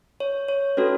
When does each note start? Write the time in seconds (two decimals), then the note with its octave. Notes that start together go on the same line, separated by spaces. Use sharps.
0.20 C#5
0.48 C#5
0.77 A3 C#4 F#4 A4 B4